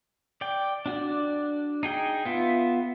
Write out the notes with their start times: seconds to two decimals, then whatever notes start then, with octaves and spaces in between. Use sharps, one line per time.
0.41 D5 G5
0.86 D4 F#4 D5
1.83 D#4 G#4 G5
2.26 B3 F4 E5